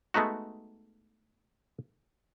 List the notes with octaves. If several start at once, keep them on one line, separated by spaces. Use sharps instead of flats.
G#3 A3 B3 D#4 F#4